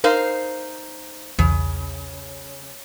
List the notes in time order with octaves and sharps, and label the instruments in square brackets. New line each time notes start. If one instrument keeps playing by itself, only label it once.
[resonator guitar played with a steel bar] D#4 C5 F5 [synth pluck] A#4
[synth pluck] B1 E2 [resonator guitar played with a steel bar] C#3